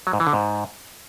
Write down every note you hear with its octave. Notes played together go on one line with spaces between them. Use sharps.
F#3
G#2
E3
D3
G#2